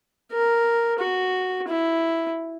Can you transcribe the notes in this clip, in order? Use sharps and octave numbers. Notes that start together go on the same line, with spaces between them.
A#4
F#4
E4